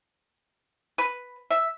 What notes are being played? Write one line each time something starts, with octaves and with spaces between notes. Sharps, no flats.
B4
E5